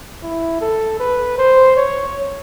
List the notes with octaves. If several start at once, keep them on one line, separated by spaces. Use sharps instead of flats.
E4
A4
B4
C5
C#5